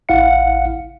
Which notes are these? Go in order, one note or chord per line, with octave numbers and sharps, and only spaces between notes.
A1 E4 F5 F#5 C#7